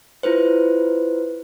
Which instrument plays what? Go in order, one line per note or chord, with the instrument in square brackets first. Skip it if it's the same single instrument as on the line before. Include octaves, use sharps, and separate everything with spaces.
[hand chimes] E4 F4 B4 C5